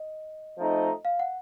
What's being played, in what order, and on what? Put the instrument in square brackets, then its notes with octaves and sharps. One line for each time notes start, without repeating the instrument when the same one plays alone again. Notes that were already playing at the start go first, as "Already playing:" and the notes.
Already playing: [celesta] D#5
[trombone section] F3 A3 C4 D#4
[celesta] F5
F#5